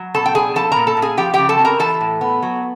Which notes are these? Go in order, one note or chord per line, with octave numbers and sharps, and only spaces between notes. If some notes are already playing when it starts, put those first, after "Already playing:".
Already playing: F#3
B2 A4 A5
G5
D4 G#4 G#5
F3 A4 A5
A#2 A#4 A#5
A4 A5
A#2
G#4 G#5
F3 G4 G5
C#3 G4 G5
A4 A5
C4
A#4 A#5
E3 A4 A5
A2
B3
F#3